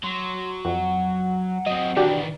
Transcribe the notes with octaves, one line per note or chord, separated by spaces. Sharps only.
F#3 C6
F2 F#5
F#3 C4 D#5
D#3 E3 D4 F#4 G4 D5